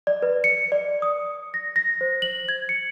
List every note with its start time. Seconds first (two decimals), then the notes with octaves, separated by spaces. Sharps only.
0.07 D5
0.22 B4
0.44 C#7
0.72 D5
1.02 D#6
1.54 A#6
1.76 A#6
2.01 C5
2.22 F#7
2.49 G#6
2.69 C#7